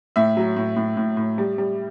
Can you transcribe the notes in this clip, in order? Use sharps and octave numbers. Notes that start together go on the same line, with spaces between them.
A2 E5
F#3
A2
A2
A2
A2
G3
G3